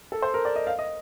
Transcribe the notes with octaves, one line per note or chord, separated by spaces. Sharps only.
A4
C5
A#4
D5
D#5
F5
D#5